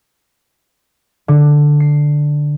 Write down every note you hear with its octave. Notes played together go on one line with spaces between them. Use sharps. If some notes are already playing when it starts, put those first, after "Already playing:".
D3
C7